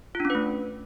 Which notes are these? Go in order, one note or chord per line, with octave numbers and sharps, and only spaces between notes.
F4
D4
C#4
B4
A3